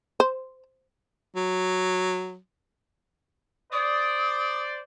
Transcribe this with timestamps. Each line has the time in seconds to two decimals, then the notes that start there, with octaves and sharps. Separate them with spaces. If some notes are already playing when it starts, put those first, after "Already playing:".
0.20 C5
1.36 F#3
3.72 C5 D5 D#6